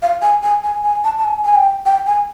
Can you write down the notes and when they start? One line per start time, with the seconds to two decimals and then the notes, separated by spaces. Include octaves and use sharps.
0.02 F5
0.22 G#5
0.43 G#5
0.64 G#5
0.84 G#5
1.04 A5
1.18 A5
1.25 G#5
1.45 G#5
1.56 G5
1.86 G5
2.06 G#5